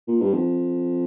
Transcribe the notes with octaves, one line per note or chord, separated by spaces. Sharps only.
A#2
G2
F2